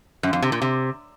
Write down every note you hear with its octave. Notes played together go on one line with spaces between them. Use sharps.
F#2
F2
C3
A#2
C3